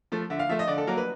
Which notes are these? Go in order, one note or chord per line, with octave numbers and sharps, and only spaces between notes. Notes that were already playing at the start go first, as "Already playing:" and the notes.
F3 A3
D3 E5
F5
F3 A3 E5
D#5
D3 D5
A4
F#3 A#3 A#4
B4